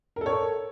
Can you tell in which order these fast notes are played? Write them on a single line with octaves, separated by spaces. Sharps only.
A#4 A4 C#5